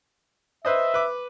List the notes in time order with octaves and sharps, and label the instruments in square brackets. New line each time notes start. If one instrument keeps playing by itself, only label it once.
[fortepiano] B4 C5 D#5 [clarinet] E5
[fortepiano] B4 D6